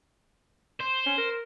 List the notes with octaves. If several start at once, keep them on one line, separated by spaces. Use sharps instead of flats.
C5
C#4
A#4